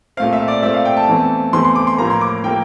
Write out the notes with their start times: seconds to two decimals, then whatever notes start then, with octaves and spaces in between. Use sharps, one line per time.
0.17 A#2 A3 C4 F5
0.33 E5
0.48 D5
0.62 A#2 A3 C4 E5
0.74 F5
0.85 G5
0.97 A5
1.08 E2 E3 A3 C4
1.53 E2 E3 A3 C4 C6
1.65 C6
1.75 D6
1.87 C6
1.98 A2 F3 A#3 A#5
2.10 C6
2.21 D6
2.44 A2 F3 A#3 G5